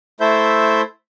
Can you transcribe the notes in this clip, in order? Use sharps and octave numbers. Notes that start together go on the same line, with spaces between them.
A3 E4 A4 C5 E5 G6